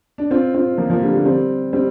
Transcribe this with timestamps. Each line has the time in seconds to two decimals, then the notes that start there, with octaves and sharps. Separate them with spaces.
0.18 D4
0.31 C4 F4
0.54 C4 F4
0.78 F3 A#3
0.90 F3 A#3
1.02 D3 G3
1.13 D3 G3
1.25 G3 C4
1.73 G3 C4